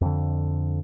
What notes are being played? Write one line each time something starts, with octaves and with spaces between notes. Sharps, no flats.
F2 D3